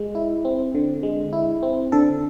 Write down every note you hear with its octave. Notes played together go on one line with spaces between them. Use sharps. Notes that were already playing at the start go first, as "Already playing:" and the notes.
Already playing: G#3
E4
C4
D3
G#3
E4
C4
D3 A4